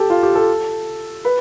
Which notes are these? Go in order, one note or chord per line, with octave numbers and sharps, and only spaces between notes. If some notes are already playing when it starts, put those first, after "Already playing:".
Already playing: G4 A4
F4
G4
A4
B4